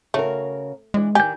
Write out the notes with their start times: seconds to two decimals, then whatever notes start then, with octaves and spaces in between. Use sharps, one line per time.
0.14 C#3 A3 F#4 A#4
0.94 E3 G#3 D4
1.15 D#3 G4 D5 G#5 G6